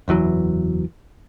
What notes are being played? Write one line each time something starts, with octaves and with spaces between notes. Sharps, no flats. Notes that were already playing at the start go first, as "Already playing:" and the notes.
F#1 E2 E3 F#3